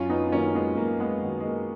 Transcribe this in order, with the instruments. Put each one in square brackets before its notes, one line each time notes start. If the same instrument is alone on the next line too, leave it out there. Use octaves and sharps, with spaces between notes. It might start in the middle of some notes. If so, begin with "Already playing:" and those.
Already playing: [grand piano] F#2 C#4 F4
B3 D#4
D#3 F#3 A#3 C#4
G#3 B3
F#2 A#3
G#3 B3
D#3 F#3
G#3
A#3